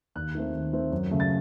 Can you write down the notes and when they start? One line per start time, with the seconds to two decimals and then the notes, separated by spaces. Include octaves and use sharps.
0.15 D#2 F#6
0.35 D#3 A3 C4
0.54 D#2
0.73 D#3 A3 C4
0.92 F#2
1.11 C#3 A3
1.20 A6